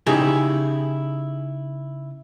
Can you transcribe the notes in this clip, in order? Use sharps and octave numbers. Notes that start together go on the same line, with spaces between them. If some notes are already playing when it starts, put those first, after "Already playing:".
C#3 D#4 E4 G4 G#4